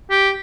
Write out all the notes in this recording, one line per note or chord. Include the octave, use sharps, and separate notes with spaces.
G4